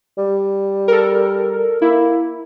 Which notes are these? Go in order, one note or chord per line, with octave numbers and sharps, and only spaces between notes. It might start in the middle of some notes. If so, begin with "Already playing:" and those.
G3
A4 A#4
A#3 E4